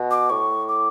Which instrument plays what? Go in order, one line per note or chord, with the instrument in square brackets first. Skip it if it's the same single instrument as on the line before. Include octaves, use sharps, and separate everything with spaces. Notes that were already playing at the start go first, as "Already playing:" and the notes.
Already playing: [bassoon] B2
[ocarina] D6
[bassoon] A2 [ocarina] C#6
[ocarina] D6